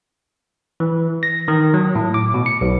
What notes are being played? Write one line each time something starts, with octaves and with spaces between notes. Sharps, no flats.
E3
A#6
D#3
F#3
A2
D6
B2
C#7
B1